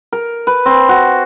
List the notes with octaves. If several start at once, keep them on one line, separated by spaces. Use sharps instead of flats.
A#4
B4
C4
F#4